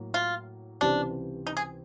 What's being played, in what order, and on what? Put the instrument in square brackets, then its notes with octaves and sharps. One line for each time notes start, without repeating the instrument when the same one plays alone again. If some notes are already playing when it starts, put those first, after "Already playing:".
Already playing: [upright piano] A2 F#3 A#3
[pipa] F4
[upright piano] C#2 C3 E3 G3 C4 [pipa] D4
[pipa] D#4
G#4